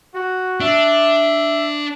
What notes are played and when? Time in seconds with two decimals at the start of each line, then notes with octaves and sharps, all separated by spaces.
0.14 F#4
0.60 D4 E5